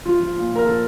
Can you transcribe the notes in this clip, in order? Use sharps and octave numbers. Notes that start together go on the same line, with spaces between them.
F3 F4
F3
A#2
A#2 A#4
F3 A4